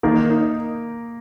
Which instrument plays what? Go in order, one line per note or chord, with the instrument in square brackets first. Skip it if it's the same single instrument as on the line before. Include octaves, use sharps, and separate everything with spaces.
[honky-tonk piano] D#3 [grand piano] A#3 A#4
[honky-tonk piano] D#4